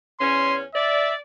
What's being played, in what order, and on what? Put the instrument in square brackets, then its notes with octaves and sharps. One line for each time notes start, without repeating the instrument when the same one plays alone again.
[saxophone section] E2 C#4 [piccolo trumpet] C6
[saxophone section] D5 [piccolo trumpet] E5